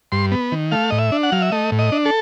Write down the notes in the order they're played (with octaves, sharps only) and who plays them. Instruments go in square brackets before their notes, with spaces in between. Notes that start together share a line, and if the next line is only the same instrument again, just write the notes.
[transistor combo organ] G2 C6
B3
D#3
A3 F5
A2 D#5
E5
D4
F#5
F#3 F5
E5
A3 D#5
A2
D#5
D4
A4